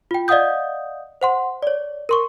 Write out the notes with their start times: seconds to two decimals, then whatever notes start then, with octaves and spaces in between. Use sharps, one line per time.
0.11 F4 G5
0.28 D5 D#5 F5 F#5 D#6 G6
1.21 C5 F#5 C6
1.63 C#5 D5
2.09 A#4 C6 C#6